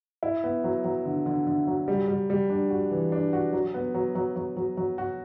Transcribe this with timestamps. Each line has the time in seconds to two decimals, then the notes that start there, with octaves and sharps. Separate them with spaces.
0.23 E4
0.44 B3
0.64 F#3
0.84 F#3
1.05 D3
1.26 D3
1.47 D3
1.67 F#3
1.88 G3
2.08 G3
2.30 G3
2.50 D4
2.70 F#4
2.91 E3
3.12 D4
3.33 F#4
3.53 F#3
3.74 B3
3.94 F#3
4.15 F#3
4.36 F#3
4.57 F#3
4.77 F#3
4.98 F#4